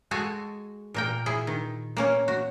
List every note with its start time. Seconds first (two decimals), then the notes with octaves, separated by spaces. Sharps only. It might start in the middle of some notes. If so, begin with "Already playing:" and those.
0.11 G#3 F#4 A4 G#5
0.94 A#2 A#4 G5
1.26 E4 G#4
1.47 D#3
1.97 A#3 C#4 C#5
2.28 F#4